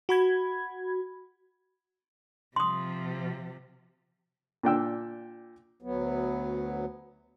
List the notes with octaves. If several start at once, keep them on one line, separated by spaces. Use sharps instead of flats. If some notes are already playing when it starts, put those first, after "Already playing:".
F#4 B5 G#6
C3 F3 C6 D#6
A#2 D4 G5 E6
D2 F#3 B3